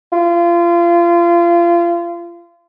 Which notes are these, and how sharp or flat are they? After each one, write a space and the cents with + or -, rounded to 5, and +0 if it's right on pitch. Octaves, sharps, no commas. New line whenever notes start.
F4 -30